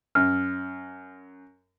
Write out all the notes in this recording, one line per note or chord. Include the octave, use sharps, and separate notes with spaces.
F#2 F6